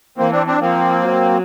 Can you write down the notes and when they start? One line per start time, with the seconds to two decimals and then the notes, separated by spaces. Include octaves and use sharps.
0.18 E3 A#3 C4
0.32 C4 D4
0.47 C4 D4
0.61 F3 A#3 C4
1.03 F#3